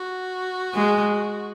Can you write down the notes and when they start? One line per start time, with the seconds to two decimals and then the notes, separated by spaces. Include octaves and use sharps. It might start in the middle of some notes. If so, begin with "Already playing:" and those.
Already playing: F#4
0.74 G#3